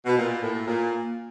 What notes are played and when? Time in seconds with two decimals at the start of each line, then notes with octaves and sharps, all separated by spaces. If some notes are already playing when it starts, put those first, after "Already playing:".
0.06 B2
0.17 A#2
0.42 A2
0.66 A#2